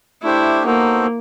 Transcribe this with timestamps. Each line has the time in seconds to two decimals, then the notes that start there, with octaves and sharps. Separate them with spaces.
0.22 A3 D4 E4 G4 C5
0.65 A#3 B3 D#4 F#4 A4 C5